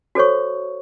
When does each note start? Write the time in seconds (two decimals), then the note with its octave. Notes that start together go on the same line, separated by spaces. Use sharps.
0.15 F#4 A4 C5 C#5 C#6